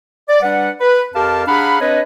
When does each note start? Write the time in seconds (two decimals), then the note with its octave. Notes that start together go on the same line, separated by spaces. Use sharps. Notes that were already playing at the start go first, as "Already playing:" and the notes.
0.29 D5
0.42 G3 D4 B4 F#5
0.81 B4
1.15 F2 G4 A#4 F5 A5
1.47 D4 G#4 F5 F#5 A#5 B5
1.80 C4 D4 B4 C#5 D#5